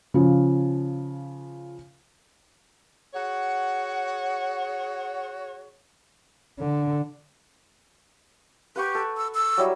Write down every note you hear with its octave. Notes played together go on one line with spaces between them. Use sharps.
C#3 F3
F#4 G#4 C#5 F#5
D3
G4 B4 F#5 C#6
A4
E6
E6
F#3 G3 E4